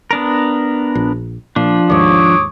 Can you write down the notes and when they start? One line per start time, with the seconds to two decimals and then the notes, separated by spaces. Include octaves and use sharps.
0.11 B3 D4 A#4
0.95 A#1
1.56 A#2 F3 D4
1.90 D#2 G#2 C#5 D6 D#6